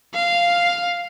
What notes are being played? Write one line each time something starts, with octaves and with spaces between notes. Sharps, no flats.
F5